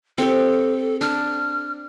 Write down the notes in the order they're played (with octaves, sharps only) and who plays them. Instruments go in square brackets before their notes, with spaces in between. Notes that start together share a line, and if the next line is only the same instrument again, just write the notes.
[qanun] C4 G4 [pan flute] A4
[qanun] D4 [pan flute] F6